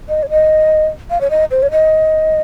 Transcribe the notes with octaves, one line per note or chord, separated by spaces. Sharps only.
D#5
C#5
D#5
F5
C#5
D#5
C5
C#5
D#5